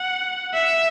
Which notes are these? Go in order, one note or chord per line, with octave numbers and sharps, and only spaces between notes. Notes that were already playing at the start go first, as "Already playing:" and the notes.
Already playing: F#5
E5